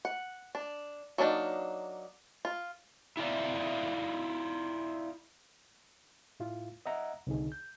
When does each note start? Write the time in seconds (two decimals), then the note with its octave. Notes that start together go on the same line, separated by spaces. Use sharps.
0.05 F#5
0.55 D4
1.18 F#3 A#3 D4 D#4
2.45 F4
3.17 E4 F4 A#4 D5 E5
6.40 A2 E4 F4
6.86 D#5 E5 F#5 A#5
7.27 C2 D3 D#3 D#4 G#4
7.52 G6